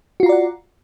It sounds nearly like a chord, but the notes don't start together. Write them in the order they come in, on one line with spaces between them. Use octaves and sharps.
F#4 F4 A#5 D5 F#5